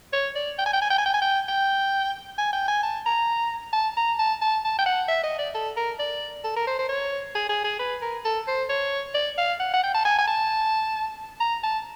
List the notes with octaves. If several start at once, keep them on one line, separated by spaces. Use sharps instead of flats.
C#5
D5
G5
G#5
G5
G#5
G5
G#5
G5
G#5
G5
G5
G#5
G5
G#5
A5
A#5
A5
A#5
A5
A5
A5
G5
F#5
E5
D#5
D5
A4
A#4
D5
A4
A#4
C5
C5
C#5
G#4
G#4
G#4
B4
A#4
A4
C5
C#5
D5
F5
F#5
F#5
G5
A5
G#5
G#5
A5
A#5
A5